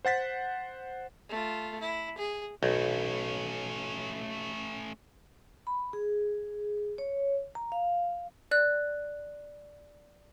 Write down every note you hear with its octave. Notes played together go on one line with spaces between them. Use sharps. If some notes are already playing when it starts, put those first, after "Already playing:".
C5 F#5 A6 B6
A3 F4
E4
G#4
B1 A3 C#4
B5
G#4
C#5
A#5
F5
D5 F#6